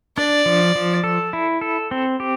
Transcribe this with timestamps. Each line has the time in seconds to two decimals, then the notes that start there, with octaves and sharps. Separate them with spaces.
0.17 D4 D5
0.46 F3
0.75 F3
1.04 A4
1.33 E4
1.61 A4
1.91 C4
2.20 G4